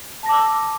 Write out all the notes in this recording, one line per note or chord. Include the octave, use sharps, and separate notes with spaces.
A5 D6 E6 A#6